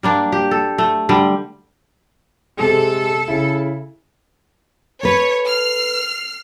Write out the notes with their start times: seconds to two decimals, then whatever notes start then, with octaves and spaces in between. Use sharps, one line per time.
0.03 G3 A#3 D4
0.32 G4
0.51 A4
0.78 A3
1.09 D3 G3
2.59 C3 G#3 A4
3.28 C#3 E4
5.03 A4 B4 C#5
5.47 F6 C7